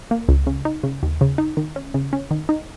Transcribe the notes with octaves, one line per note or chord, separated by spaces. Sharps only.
A#3
C#2
C#3
D#4
C#3
D#2
C#3
D#4
D#3
C#4
C#3
C#4
D#3
D#4